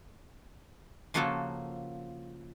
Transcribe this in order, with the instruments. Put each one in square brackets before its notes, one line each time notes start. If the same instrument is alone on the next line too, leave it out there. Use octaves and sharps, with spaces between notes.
[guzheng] C#3 F3 A#3 F#4 A4